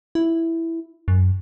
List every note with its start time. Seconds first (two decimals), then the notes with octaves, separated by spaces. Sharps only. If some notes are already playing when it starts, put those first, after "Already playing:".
0.15 E4
1.08 F#2